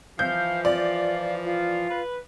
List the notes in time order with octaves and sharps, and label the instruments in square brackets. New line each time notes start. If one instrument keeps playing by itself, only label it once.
[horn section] E3 F3 [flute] F5 [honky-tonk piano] G6
[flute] F4 [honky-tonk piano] D5
[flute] F4
[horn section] B4